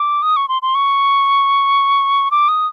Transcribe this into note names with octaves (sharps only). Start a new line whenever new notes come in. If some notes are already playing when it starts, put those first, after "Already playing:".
Already playing: D6
D#6
C#6
C6
C6
C#6
D6
D#6